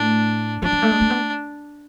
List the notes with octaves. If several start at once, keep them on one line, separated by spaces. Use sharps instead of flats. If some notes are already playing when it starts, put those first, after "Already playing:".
Already playing: A2 D4
F3 D4
F3
A3
G#3
A3
B3